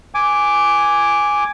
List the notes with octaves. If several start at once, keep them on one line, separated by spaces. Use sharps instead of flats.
G#5 D6